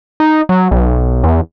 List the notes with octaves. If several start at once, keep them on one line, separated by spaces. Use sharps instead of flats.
D#4
F#3
B1
E2